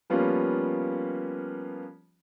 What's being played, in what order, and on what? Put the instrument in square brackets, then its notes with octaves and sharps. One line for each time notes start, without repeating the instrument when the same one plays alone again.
[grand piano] F3 G3 A#3 B3 C#4 F4